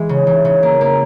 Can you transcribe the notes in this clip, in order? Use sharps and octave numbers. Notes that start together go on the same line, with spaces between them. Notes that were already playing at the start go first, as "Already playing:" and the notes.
Already playing: E3 G#3
C#3
E3
C#3
A#3
A#3